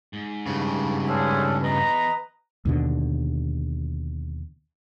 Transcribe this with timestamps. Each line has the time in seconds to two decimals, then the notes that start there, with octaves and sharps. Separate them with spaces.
0.13 G#2
0.47 G2 C#3
1.08 B3 C#4 D4 G#4 A4 C5
1.64 E2 B4 D#5 A#5
2.65 D#2 B2 D3